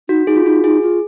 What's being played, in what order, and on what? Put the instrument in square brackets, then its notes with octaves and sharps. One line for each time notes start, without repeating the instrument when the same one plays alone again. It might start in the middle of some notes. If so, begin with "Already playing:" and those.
[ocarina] D#4 [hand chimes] F#4
[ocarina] D#4 [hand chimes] G#4
[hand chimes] F4
[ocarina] D#4 [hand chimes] F#4
[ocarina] D#4 [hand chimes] G#4
[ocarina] F4